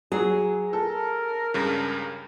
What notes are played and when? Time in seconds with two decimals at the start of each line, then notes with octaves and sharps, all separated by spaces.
0.12 F#3 G#4
0.73 A4 A#4
1.54 C#2 G2 C#3